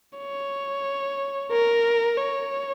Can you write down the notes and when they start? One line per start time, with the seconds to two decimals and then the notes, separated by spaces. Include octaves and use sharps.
0.19 C#5
1.52 A#4
2.17 C#5